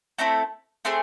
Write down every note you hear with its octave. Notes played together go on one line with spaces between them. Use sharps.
A3 C4 E4 A4 A#5
A3 C4 G#4 C6